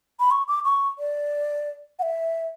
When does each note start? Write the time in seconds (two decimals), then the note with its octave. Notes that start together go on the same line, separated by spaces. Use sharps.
0.20 B5
0.31 C#6
0.48 D6
0.64 C#6
0.99 D5
1.99 F#5
2.02 E5